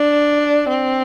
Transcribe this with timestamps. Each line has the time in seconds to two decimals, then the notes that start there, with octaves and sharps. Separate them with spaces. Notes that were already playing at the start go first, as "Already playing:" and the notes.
Already playing: D4
0.69 C4